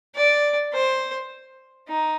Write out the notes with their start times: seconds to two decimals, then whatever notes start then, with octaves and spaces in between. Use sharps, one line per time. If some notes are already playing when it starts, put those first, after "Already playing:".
0.15 D5
0.73 C5
1.88 D#4